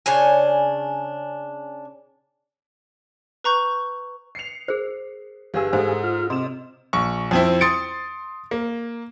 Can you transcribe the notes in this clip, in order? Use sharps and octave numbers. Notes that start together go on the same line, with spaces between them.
C#3 D4 C#5 G#5
B4 A#5 C#6 G6
C7 C#7 F7
G#4 A#4 C5
G1 G4 G#4 F5 G#5 E6
G#2 A4 C5
F4 F6
C3 D#5 C6 E7
A#1 C#6
F2 C4 E4
C6 D#6 A6 C#7 D7
A#3